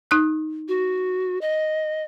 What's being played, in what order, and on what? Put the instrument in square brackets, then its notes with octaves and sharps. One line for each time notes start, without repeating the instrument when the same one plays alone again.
[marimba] D#4 D#6 F#6
[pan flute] F#4
D#5